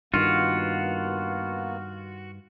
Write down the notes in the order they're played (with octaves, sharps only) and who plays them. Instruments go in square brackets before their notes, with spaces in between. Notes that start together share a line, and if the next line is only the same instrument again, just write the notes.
[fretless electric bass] G2 D#3 [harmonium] A#3 B3 [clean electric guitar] F4 [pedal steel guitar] F#4